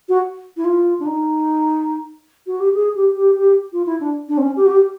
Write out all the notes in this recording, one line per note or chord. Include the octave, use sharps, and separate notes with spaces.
F#4
E4
F4
D4
D#4
F#4
G4
G#4
G4
G4
G4
F4
E4
D4
D4
C4
C#4
G4
F#4
G4